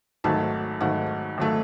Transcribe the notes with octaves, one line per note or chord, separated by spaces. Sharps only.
G#1 G#2 F#3 A3 A5
G#1 G#2 F#3 A3 F#5
G#1 F#3 A3